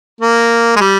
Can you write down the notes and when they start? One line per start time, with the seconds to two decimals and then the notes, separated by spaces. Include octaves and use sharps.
0.21 A#3
0.76 G#3
0.81 G3